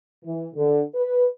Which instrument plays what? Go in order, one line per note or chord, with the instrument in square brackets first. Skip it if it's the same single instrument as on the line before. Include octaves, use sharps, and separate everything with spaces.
[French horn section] E3
D3
B4